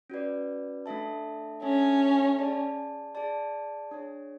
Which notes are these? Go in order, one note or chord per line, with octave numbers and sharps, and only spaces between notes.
C#4 F#4 B4 D5
A3 D4 A4 E5 A5
A3 C#4 D4 A4 E5 A5
G#4 D5 A5
G#4 D5 A5
D4 G#4 C#5